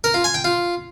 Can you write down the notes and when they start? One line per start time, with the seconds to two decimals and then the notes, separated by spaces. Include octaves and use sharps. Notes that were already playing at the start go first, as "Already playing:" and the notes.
0.04 A#4
0.14 F4
0.24 G#5
0.34 G5
0.44 F4